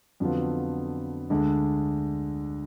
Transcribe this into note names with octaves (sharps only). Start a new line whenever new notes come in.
F2 D3 F#3 B3 F4
D2 D3 G#3 D4